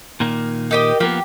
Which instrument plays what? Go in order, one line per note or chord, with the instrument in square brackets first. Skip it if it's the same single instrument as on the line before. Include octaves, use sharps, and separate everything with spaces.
[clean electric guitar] A#2 D#3 A#3
[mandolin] D#4 G4 D#5 [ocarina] A#4
[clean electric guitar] F3 A#3 B3 [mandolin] G4